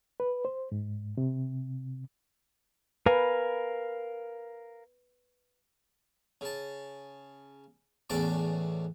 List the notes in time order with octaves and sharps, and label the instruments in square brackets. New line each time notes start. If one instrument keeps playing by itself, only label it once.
[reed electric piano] B4
C5
G#2
C3
[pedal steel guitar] A#4 F5 G#5 [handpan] B4
[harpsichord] C#3 A5
E2 A2 C#3 D4 A5 D6